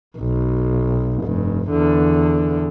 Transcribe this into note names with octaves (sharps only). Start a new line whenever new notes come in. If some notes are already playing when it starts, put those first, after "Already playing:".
B1
F1 G2
E2 D3